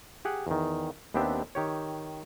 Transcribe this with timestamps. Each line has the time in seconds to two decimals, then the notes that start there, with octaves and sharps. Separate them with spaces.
0.25 G4 G#4 F#5
0.47 E2 D#3
1.14 D#2 B3 C4 D4 G4 E5
1.55 D#3 G4 C#5